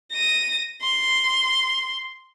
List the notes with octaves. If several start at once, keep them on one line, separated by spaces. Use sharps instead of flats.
A#6 D#7
C6